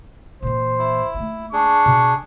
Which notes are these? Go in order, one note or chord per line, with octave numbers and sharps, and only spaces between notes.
A#2 E3 C5
E4
A3 A#3
D4 G#4 C#6
B2